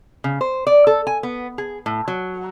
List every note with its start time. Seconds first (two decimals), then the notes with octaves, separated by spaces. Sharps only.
0.24 C#3
0.41 C5
0.67 D5
0.87 A4
1.07 G#5
1.23 B3
1.58 G#4
1.86 A2
2.08 F#3